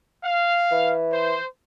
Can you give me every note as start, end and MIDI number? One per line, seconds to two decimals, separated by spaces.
0.24 0.94 77
0.72 1.35 52
1.12 1.44 72